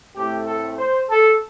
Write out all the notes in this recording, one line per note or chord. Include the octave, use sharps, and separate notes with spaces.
A2 A3 C4 G4
A4
C5
A4